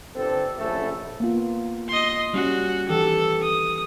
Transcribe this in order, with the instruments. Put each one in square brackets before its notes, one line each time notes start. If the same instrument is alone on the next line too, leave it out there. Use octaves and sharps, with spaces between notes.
[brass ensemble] G1 C4 D4 A4
A#1 F#2 C#3 A3 A4
[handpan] A#3 B3 F4
[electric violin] D#5 C6
[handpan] G3 C#4 [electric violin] F#4
[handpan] D#3 E3 G4 [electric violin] A4
[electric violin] D#6